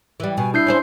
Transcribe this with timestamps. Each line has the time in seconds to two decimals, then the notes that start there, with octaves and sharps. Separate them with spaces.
0.20 E3 G3
0.37 B2 G#5
0.54 D4 E4 G6 C7
0.67 C#4 G#4 C5